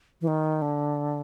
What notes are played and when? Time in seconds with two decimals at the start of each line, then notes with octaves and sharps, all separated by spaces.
0.21 E3
0.28 D#3
0.62 D3